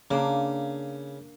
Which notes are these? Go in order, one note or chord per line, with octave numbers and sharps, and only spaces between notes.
C#3 A#3 D4